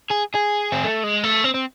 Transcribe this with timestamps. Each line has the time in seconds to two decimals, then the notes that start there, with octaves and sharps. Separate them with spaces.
0.10 G#4
0.34 G#4
0.72 C4
0.84 A3
1.04 G#3
1.24 A3
1.44 C4
1.54 C4